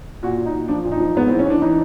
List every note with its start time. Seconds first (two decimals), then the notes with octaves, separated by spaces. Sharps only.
0.23 A#2 F#4
0.37 A#2
0.46 D#4
0.53 A#2
0.68 F3 D4
0.85 A#2
0.92 D#4
1.00 F3
1.16 G#2 B3
1.28 E3 C4
1.39 C#4
1.46 E3 D4
1.62 E3 D#4